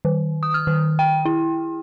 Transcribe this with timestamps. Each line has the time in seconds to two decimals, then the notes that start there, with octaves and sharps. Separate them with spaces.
0.05 D#3
0.43 D#6
0.54 F6
0.67 D#3
0.99 G5
1.25 E4